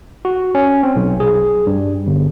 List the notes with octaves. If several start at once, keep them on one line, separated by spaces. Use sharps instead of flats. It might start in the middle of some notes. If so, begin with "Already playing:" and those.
F#4
C#4
C4
B1
G#4
G2
G1